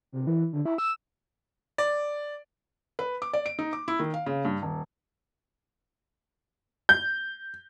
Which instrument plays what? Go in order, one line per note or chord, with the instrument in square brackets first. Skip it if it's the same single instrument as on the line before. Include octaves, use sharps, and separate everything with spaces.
[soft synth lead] C3
E3
D3
E4
E6
[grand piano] D5
[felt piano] B4
D6
D5
D7
D#4
D6
E4
D#3
F5
C#3
G2
D#1
[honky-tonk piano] G6